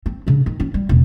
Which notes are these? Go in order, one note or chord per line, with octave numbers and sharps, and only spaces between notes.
C4
C#3 D4
D#3
C#4 F4
G3
E1 C#2